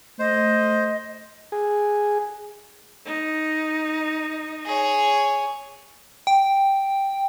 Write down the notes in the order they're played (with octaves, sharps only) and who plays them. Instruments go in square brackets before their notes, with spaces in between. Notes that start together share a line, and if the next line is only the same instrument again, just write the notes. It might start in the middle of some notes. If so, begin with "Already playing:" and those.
[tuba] A3 [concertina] C5 [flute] D#5
[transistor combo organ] G#4
[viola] D#4
[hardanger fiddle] G#4 C#5
[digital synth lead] G5